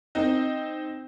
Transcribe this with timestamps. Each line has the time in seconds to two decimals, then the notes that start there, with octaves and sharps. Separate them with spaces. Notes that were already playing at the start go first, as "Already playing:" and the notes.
0.15 C4 D#4